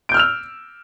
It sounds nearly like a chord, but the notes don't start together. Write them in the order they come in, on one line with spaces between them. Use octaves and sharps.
D7 G6 F6 E6 F7